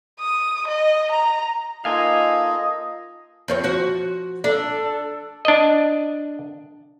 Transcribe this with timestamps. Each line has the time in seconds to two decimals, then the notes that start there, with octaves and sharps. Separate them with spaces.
0.19 D#6
0.67 D#5
1.11 A#5
1.85 A#3 D#4 F4 A4 D#5 F5 G#5 C6
3.48 F2 C5 C#5
3.64 F3 F#4
4.44 D4 A4
5.45 D4 D#5